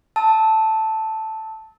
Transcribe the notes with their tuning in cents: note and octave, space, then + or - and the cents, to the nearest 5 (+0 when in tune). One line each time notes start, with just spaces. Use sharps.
A5 +0 E6 -30